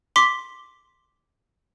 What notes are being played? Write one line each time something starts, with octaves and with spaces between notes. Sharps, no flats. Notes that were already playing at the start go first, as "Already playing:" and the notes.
C6 D6 B6